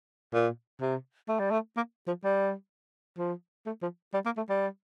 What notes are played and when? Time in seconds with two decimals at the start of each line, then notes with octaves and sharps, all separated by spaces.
0.33 A#2
0.81 C3
1.28 A3
1.39 G3
1.51 A3
1.76 A#3
2.07 F3
2.24 G3
3.18 F3
3.66 A3
3.82 F3
4.14 G3
4.25 A#3
4.37 A3
4.49 G3